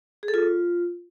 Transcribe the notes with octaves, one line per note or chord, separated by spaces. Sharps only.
G#4
A4
F4